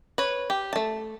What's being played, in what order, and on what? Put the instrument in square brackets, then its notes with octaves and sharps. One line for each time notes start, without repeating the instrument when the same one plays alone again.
[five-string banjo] B4 C#5
G4
A3 A5